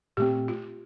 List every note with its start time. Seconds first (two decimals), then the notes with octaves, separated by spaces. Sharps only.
0.17 A#2 A3 C4 G4
0.48 F4